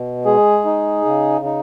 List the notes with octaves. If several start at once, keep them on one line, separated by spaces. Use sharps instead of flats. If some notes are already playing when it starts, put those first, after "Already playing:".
Already playing: B2
G#3 G#4
D#4
C#3
D#4